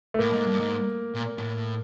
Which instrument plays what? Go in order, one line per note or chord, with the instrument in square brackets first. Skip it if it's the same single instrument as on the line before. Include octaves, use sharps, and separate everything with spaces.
[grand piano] A3
[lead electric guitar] A2 [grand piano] A#3
[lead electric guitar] G#2
G2
G#2
A#2
A2